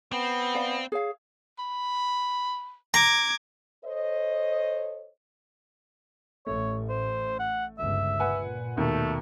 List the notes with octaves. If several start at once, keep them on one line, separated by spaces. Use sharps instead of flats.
B3 C4
D5 F5 B5
G#4 C#5 F5
B5
A#5 D6 G#6
A4 C5 C#5 D#5
A1 A3 C#5
C5
F#5
G1 C#2 E5
A#2 B4 F#5 G#5
D#2 B2 A3